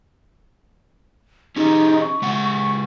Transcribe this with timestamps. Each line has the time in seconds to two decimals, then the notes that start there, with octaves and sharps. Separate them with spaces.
1.56 C#4 D#4 G4 G#4
2.01 C#6
2.22 C#3 G#3 F#5
2.52 C#6